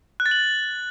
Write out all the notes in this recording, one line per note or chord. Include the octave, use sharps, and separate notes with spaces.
F#6
A6
F#7